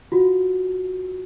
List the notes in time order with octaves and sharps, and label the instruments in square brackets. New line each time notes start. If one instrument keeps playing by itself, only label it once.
[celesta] F4 F#4